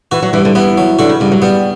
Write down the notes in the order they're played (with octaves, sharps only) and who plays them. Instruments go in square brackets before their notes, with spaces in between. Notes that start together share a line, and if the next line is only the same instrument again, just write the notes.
[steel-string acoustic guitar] E3 [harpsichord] F#4
[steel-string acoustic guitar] F#3
[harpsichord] G2 [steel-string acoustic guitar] E3
[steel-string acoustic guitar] D3
[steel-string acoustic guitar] E3 [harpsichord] B3
[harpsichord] F#3
[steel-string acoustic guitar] D3 [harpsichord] F#4
[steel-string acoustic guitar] C#3
[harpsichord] G2 [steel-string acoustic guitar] C#3
[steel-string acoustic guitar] F#3
[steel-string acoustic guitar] G3 [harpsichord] B3